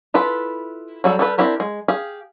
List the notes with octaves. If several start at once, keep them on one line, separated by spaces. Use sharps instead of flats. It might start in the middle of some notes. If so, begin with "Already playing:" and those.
E4 F4 A4 B4
F#3 G3 A4
G3 A4 B4
C4 D4 E4 G4 A#4
G#3
G4 G#4 F5